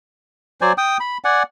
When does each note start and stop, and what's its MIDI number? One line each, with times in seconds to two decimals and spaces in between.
0.61 0.73 54
0.61 0.73 72
0.61 0.73 74
0.61 0.73 80
0.78 0.97 79
0.78 0.97 87
1.00 1.18 83
1.24 1.43 74
1.24 1.43 78
1.24 1.43 80